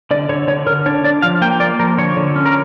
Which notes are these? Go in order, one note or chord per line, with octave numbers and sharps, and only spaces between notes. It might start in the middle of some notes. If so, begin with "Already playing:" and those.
D3 D5
D3 C#5
D3 C#5
D3 A#4
D4 C#5
D4 D5
F3 F5
A#3 G5
A#3 D5
F3 A#4
D3 C#5
D3
C#4
A#4